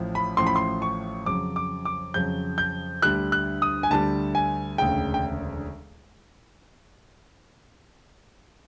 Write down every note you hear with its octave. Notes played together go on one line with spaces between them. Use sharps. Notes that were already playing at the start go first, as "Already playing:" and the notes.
Already playing: A1 A2 F3
B5
A1 A2 F3 C6
B5
C6
C#6
F2 C#3 F#3 D6
D6
D6
F2 C#3 F#3 G6
G6
D2 D3 G3 F#6
F#6
D#6
G#5
D2 D3 G3 A5
G#5
E1 D2 C#3 G5
G5